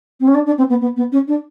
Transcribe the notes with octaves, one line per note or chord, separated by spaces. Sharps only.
C4
C#4
D4
D4
C4
B3
B3
B3
C#4
D4